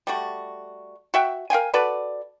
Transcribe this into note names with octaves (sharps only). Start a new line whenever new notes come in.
G3 A3 F#4
F#4 E5 G5
A#4 F5 G5 G#5
F#4 A4 B4 D5